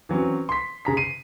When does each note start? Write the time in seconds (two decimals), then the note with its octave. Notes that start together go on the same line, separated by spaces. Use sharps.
0.09 E3 F#3 C4 C#4
0.49 C6 B6
0.85 C#3 A#5 B6
0.97 C7 D#7